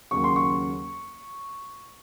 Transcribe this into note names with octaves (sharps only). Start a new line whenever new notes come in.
D#2 C#3 F#3 C#6
C6
C#6